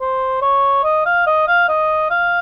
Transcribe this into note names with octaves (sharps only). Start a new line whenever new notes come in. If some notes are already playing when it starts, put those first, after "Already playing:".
C5
C#5
D#5
F5
D#5
F5
D#5
F5